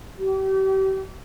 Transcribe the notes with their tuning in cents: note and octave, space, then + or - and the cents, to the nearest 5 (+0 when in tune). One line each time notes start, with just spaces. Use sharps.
G4 -35